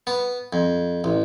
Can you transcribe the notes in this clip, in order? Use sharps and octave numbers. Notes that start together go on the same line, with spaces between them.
B3
F2
A1